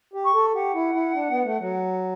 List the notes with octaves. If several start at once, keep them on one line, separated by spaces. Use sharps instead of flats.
G4
C#6
A4
G4 F#5
E4
E4
D4
B3
A3
F#3